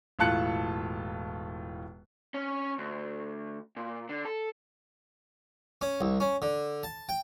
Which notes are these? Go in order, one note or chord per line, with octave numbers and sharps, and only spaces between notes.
E1 A2 F4 A5 F#6 C#7
C#4
D2
A#2
D3
A4
C#4
C2
C#4
D3
A5
G5